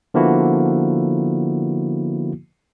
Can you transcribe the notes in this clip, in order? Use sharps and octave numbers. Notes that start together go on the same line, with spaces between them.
D3 F3 A#3 B3 E4 F#4